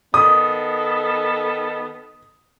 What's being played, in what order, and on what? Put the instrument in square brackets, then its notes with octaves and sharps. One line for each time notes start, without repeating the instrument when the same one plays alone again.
[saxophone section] D#3 B3 A4 [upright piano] D#6